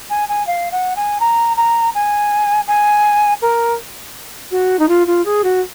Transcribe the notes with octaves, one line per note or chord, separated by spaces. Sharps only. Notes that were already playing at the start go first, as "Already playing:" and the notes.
G#5
G#5
F5
F#5
G#5
A#5
A#5
G#5
G#5
A#4
F#4
D#4
F4
F4
G#4
F#4